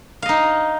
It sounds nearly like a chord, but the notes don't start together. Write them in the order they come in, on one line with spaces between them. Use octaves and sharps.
F5 D#5 D#4